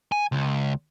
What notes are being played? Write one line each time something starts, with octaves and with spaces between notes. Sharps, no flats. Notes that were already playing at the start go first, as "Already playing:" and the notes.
G#5
C#2